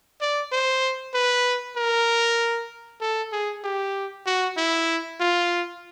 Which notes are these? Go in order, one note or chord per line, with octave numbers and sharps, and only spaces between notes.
D5
C5
B4
A#4
A4
G#4
G4
F#4
E4
F4